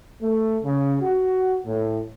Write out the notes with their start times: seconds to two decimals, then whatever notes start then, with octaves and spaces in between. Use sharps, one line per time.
0.22 A3
0.63 C#3
1.01 F#4
1.65 A2